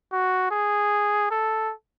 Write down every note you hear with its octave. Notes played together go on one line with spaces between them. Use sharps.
F#4
G#4
A4